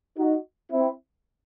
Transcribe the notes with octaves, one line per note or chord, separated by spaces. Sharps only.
D#4 F#4
C4 E4